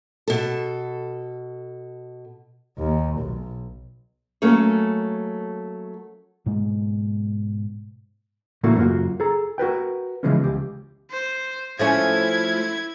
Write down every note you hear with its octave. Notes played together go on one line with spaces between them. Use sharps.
B2 A4
D#2
B1
F#3 A3 A#3 C#4 C#5
G#2 B2 G#3
A2 C#3 E3 A3 A#3 F#4
F#2 C#3 A#3 F4 F#4
G#4 A4 A#5
F#4 A#4 B4 G5
C#3 E3 F3 G#3 B3 C#4
C#2 G4
C5
F3 A3 C#4 E4 G#6